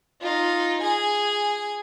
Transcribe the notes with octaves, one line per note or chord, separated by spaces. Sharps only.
D#4 F4
G#4 G#5